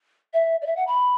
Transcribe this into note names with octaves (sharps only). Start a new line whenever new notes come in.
E5
D5
E5
F#5
B5